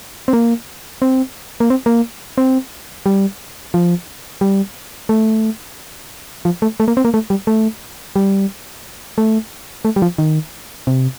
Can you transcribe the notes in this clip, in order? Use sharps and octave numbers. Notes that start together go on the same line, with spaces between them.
C4
A#3
C4
A#3
C4
A#3
C4
G3
F3
G3
A3
F3
A3
A3
A#3
C4
A#3
A3
G3
A3
G3
A3
A3
G3
F3
D#3
C3